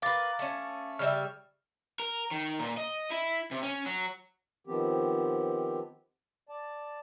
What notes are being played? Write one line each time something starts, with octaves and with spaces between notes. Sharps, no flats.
A#4 B4 F5 D6 A6
A3 C#4
C#3 G3 E5 F6
A#4
D#3
A#2
D#5
E4
C3
C#4
F#3
D#3 F3 B3 C4 G4
D5 A5